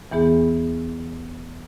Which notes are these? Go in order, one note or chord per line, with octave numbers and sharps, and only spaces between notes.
E2 E3 B3 G#4